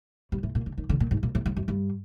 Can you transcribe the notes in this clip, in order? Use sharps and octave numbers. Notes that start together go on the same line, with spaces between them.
G2
A2
A#2
D3
D#3
D3
A#2
G#2
A#2
A2
G#2
F#2
G2